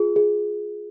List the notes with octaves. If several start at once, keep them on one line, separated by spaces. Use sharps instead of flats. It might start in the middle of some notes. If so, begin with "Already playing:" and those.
Already playing: F4 G#4
G#4